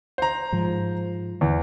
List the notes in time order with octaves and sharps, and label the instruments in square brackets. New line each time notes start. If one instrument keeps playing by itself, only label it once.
[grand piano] C5 A#5
[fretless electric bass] G#2 F3
[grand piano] E2